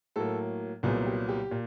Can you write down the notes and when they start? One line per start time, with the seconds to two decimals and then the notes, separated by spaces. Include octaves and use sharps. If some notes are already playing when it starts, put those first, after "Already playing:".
0.16 A2 F#3 A#3 A4
0.83 C2 A#2 F#3 B3 G#4
1.06 G4
1.29 G4
1.51 A#2